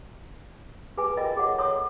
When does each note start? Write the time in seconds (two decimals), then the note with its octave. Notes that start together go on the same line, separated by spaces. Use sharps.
0.97 G#4 B4 G#5
1.17 F4 A#4 D#5 G5
1.37 G#4 C#5 F#5
1.58 A4 C#5 C6 D#6